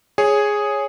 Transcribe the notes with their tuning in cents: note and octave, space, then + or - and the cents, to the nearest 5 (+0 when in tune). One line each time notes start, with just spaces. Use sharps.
G#4 +0 C#5 +0